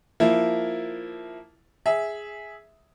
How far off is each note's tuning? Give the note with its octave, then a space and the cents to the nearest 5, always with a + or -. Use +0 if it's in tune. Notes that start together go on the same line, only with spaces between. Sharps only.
F3 +0 A#3 +0 E4 +0
G#4 +0 E5 -10